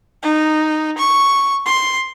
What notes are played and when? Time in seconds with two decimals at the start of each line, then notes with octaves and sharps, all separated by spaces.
0.22 D#4
0.98 C#6
1.66 C6